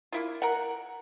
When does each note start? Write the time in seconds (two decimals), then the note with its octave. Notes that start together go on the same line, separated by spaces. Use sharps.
0.13 A#3 E4 F4
0.42 A#4 F#5